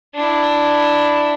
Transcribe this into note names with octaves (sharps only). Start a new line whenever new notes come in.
D4 E4